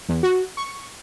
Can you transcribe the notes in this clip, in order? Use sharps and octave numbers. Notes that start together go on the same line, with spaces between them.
E2
F#4
C#6